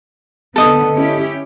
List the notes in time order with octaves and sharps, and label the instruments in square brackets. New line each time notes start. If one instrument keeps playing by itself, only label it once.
[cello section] D3 B3 [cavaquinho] A4 D#5 D#6
[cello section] C#4 E4 G4